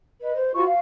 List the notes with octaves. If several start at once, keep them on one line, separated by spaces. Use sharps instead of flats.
B4 D#5
C5
F4 F#4 C#6
F5